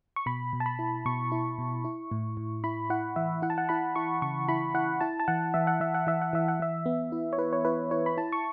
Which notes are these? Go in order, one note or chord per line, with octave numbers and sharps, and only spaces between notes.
C#6
B2 B5
B2
A5
B5
E4
B2 C#6
E4
B2
E4
A2
A2
E4 B5
E4 F#5
E3 E5
E4 F#5
A5
F#5
E4 B5
E4 C#6
C#3 C#6
E4 B5
E4 F#5
E4 A5
A5
E3 F#5
E3 E5
F#5
E3 E5
F#5
E3 E5
F#5
E3 E5
F#5
E3 E5
B3
E4
C#5
E4 B4
C#5
E4 B4
E4 C#5
B5
E4 A5
C#6